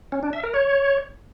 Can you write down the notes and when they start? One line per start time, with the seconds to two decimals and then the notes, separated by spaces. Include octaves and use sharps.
0.12 C#4
0.23 D4
0.33 E5
0.43 A#4
0.54 C#5